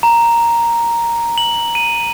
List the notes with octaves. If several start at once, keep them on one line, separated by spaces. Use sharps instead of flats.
A#5
F#7
D#7